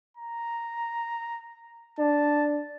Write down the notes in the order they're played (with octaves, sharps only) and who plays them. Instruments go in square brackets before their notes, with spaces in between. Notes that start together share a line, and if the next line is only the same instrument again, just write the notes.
[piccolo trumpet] A#5
[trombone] D4 [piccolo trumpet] A5